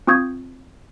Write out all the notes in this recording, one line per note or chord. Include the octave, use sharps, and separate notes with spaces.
C4 F4 C#6 D#6 G6 G#6